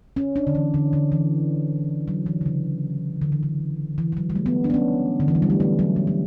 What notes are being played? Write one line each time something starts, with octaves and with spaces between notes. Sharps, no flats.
C#4
D4
D3
E3
D3
D3
E3
F#3
E3
D3
C#3
D3
E3
D3
E3
E3
F#3
G3
A3
B3
D4
B3
C#4
D3
E3
F#3
G3
A3
A3
F#3
E3
F#3